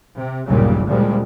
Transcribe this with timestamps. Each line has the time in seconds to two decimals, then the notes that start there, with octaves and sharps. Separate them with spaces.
0.16 C3
0.47 G1 D#2 A#2 C#3 F#3 G3
0.85 D2 A#2 C#3 F3 G3 G#3